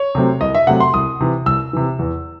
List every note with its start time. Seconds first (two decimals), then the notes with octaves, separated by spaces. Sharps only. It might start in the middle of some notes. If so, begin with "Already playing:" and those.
Already playing: C#5
0.15 C3 F#3 A3 C4
0.41 C2 D#5
0.55 E5
0.67 C3 F#3 A3 C4 F#5
0.80 C6
0.94 C2 D#6
1.20 C3 E3
1.46 C2 E6
1.73 C3 E3
1.99 E2